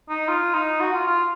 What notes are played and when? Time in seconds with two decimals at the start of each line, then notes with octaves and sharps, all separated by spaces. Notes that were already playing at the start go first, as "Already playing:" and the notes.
0.09 D#4
0.28 F4
0.54 D#4
0.80 F#4
0.93 F4
1.07 F4